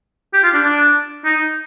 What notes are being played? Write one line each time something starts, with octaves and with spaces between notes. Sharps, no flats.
G4
F4
D4
D4
D#4